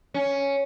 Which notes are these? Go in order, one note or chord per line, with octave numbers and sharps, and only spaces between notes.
C#4